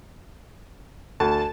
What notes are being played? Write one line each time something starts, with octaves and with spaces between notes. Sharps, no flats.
D2 A5